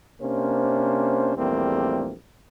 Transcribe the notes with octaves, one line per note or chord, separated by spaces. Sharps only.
C3 A#3 C#4 D4 C5
A#1 E2 G3 A3 A#3 C4